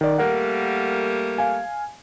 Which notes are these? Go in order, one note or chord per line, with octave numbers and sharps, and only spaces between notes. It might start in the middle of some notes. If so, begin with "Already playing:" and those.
D#3 D5
G3 A3 A#3 A#4 F#5
F5 G#5